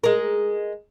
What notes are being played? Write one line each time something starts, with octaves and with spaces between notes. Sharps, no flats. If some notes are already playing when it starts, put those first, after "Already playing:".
G#3 A#4